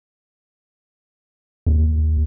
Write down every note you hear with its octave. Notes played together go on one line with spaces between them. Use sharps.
D#2